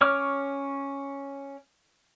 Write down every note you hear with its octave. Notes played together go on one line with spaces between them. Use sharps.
C#4 C#5 D6 F6